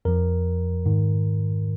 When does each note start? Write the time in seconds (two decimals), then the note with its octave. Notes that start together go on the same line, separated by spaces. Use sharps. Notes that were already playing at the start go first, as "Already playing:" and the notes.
0.05 F2 F3 A#4
0.86 G#2 D#3